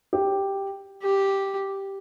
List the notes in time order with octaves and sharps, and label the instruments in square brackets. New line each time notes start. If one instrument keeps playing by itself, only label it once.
[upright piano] G4
[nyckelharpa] G4